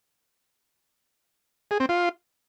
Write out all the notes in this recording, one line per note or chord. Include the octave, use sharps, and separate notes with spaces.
G#4
C4
F4